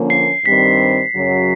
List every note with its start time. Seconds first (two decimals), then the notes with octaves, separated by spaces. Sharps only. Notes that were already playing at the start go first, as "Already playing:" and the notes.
Already playing: D3 F3 A#3 C#4
0.10 C7
0.45 G2 D#3 G3 C4 B6
1.15 F#2 C#3 F#3